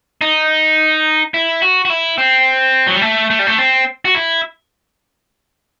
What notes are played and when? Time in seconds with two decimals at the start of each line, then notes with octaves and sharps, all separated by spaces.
0.21 D#4
1.34 E4
1.62 F#4
1.85 F#4
1.90 E4
2.18 C4
2.87 F#3
2.95 G3
3.02 A3
3.30 A3
3.39 G3
3.47 A3
3.58 C4
4.05 F#4
4.15 E4